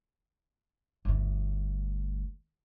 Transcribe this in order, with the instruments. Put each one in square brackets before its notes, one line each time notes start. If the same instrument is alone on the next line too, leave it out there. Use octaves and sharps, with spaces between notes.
[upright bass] G1 D2